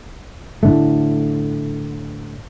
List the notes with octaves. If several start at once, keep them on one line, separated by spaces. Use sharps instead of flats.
A2 D3 A3